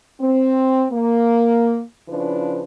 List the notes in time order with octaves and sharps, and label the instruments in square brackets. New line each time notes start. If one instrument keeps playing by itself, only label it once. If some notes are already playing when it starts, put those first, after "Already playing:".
[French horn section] C4
A#3
C#3 F3 C#4 D4 E4 B4